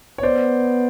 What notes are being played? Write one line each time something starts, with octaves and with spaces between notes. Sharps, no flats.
C#5
B3 C5 D5